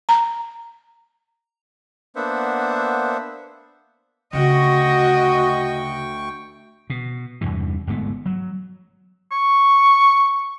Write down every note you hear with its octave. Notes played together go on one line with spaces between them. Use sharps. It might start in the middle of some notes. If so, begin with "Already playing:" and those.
A#5
A#3 B3 D4 C5 E5 F#5
D2 C#3 F#4 D#5 G5 C#6
B2
E2 G2 C3 E3
G1 G#2 A3 B3
F#3
C#6